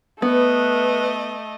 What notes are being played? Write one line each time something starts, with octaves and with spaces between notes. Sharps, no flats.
A3 B3 B4 D#5